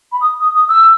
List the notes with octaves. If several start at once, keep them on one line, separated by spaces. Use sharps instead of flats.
B5
D#6
D#6
D#6
E6